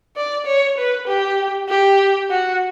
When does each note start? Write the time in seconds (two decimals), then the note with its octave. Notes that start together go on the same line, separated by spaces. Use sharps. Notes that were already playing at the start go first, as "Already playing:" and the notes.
0.16 D5
0.46 C#5
0.78 B4
1.08 G4
1.69 G4
2.30 F#4